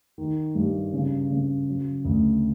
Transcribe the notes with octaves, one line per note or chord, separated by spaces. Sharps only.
D#3
G2
C#3
C#3
F#3
D2